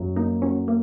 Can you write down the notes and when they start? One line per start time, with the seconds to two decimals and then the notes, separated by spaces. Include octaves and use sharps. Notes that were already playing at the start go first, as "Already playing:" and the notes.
Already playing: F#2 F#3
0.16 A#3 D#4
0.42 C#4 F#4
0.68 A#3